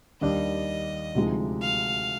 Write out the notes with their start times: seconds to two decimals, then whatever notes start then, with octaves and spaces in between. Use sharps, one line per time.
0.21 D#2 D#3 G3 D4 D#5
1.15 D2 C3 F3 G#3 D#4
1.62 F5